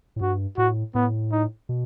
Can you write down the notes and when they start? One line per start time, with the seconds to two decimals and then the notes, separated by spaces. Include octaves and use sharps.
0.16 A2
0.21 G2 F#4
0.57 A2 F#4
0.95 A2 B3
1.32 D#4
1.69 B2